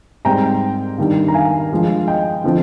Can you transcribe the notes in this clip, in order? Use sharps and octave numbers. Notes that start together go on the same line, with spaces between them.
G#2 G3 C4 G5 A#5
G2 D#3 G3
A#5
F5 G#5
G2 F3 G#3
D#5 G5
D3 F3 C4